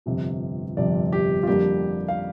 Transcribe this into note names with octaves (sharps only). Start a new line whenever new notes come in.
G1 F2 C3 F3
G1 F2 C3 F3 D5
G4
F4
F2 D3 G3 A#3 G4
F5